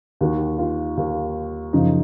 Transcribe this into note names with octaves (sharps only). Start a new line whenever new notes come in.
D#2 D#3 F#4
F4
D#2 D#3
F#1 F#2 C#3 F3 D#4